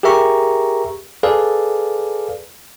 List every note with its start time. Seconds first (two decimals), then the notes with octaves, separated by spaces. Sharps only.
0.03 G4 G#4 A#4 E5 A#5 C#6
1.23 G#4 A4 B4 D5 F5